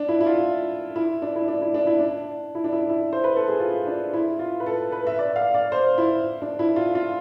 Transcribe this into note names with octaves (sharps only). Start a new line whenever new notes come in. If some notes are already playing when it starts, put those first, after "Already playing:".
Already playing: D4
E4
E4
F4
E4
D4
E4
D4
E4
D4
E4
D4
E4
D4
E4
E4
C5
B4
A4
G#4
F4
D4
E4
F4
B4
A4
B4
E5
D5
F5
D5
C5
E4
D4
E4
F4
F4